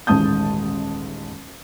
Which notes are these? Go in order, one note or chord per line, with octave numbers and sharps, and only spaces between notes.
D#1 A1 G#2 A5 D#6 G6